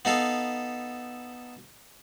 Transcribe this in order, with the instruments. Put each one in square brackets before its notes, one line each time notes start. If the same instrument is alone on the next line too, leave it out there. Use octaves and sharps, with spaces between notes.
[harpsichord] B3 D#4 A4 F5